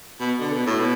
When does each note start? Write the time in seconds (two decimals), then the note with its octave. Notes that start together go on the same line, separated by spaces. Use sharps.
0.20 B2
0.40 D3
0.53 B2
0.67 A2
0.80 B2